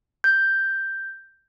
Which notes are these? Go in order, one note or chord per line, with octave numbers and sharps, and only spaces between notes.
G6